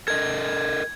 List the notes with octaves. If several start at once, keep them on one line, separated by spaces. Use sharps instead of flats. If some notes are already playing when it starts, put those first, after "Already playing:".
A4 A#4 D#5 G#6